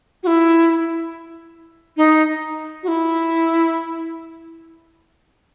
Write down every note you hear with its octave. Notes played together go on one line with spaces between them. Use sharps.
F#4
E4
D#4
F#4
E4